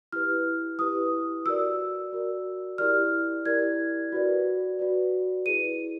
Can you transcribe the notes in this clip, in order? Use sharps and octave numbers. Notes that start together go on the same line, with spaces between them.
E4 G4 B4 F6
E4 G4 B4 D#6
F#4 A#4 D5 E6
F#4 A#4 D5
E4 G4 A#4 D5 F6
E4 G4 A#4 D5 G#6
F#4 B4 D5
F#4 B4 D5
E4 G#4 B4 D#7